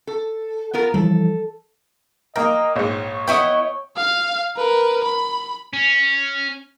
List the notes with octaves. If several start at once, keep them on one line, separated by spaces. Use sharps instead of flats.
A4
B3 F4 A#4
E3 F3 G3 A4
A#3 A#4 D#5 G5
A#1 G#2 C#5
B3 E4 D#5 G5 C#6 D#6
F5
A#4 B4
B5
C#4